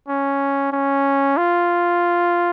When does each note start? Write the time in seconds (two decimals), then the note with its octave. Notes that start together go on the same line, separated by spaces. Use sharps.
0.09 C#4
0.73 C#4
1.37 F4